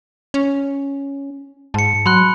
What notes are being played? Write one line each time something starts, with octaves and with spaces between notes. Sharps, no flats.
C#4
G#2 A5 C#7
F#3 B5 C6 F#6